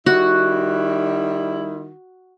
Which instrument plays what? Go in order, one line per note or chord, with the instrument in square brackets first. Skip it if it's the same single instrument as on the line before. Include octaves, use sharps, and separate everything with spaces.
[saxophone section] D#3 G3 E4 [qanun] F#4